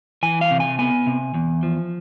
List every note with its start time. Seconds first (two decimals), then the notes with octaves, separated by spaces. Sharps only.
0.23 E3 G#5
0.41 F5
0.51 C3
0.60 G#5
0.79 B3 G#5
1.06 C3
1.34 E2
1.63 F3